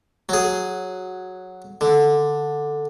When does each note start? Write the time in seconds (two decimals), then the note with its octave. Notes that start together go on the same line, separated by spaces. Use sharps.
0.29 F#3 G#4
1.81 D3